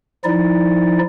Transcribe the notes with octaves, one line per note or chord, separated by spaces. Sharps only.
F3 D#4 E4 D5